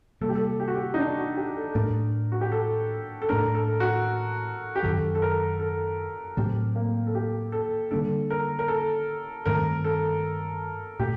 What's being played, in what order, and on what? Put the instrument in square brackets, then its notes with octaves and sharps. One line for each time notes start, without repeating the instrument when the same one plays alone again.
[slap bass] C3 G3 A#3 [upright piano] A4
[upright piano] G4
A4
G4
F#4
G4
D#4
D4
F#4
G4
A4
[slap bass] A2 A3 D4 [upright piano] A#4
[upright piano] F#4
G4
A4
A4
[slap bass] A2 A3 D4 [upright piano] A#4
[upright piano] A4
F#4
G4
[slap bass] F#2 D#3 F#3 [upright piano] A4
[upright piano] A4
A#4
A4
[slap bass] A2 F#3 A3 C4 [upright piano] G4
[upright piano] A#3
A4
G4
A4
[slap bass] D3 G3 A#3 D4 [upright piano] A4
[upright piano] A#4
A#4
A4
[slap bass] G2 D#3 A3 C4 [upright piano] A#4
[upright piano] A4
[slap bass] A#2 A3 [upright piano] G4